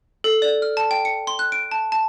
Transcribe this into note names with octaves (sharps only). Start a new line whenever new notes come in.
A4
D5
F6
A5
G5
C#7
C6
F#6
D7
A5
A5